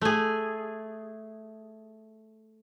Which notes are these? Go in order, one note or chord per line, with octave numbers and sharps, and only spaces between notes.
A3 G#4